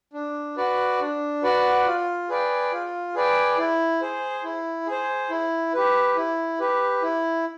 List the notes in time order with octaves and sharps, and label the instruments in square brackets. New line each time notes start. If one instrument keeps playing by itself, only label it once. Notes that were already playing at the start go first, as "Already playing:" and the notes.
[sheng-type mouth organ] D4
F#4 B4 D5 F#5
D4
F#4 B4 D5 F#5
F4
G#4 B4 D5 G5
F4
G#4 B4 D5 G5
E4
G#4 C5
E4
G#4 C5
E4
G4 B4
E4
G4 B4
E4